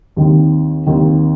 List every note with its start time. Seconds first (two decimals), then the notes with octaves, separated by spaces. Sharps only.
0.17 D#2 D#3 C4
0.87 D#2 D#3 C4